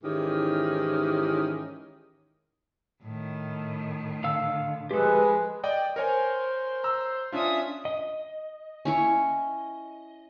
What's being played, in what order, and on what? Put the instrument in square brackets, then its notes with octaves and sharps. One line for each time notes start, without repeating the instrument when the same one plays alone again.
[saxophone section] G#2 D#3 E3 C#4 E4 G4
[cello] A2 D#3
[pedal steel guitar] D3 F5 E6
[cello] F3 [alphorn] G#3 [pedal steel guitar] G4 A4 [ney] B4
[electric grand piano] D5 D#5 G5
[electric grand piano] A#4 C#5 G#5 [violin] C5
[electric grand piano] A#5 E6
[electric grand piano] C#4 D4 F4 [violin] E5 D#6
[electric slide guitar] D#5
[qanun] C#4 E4 C#5